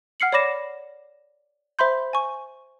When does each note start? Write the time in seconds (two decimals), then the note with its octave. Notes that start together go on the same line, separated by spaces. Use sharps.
0.20 F#5 F6 C7 C#7 F#7
0.32 C#5 D5 B5 D6 A#6 E7
1.79 C5 E5 B5 C6 G6
2.13 G#5 C#6